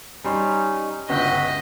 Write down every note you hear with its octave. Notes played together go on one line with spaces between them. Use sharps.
G3 C#4 D#4 C6
G1 C#2 F#4 D#5 E5 G5